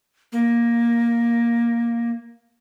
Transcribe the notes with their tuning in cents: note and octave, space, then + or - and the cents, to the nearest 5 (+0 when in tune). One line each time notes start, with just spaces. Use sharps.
A#3 +10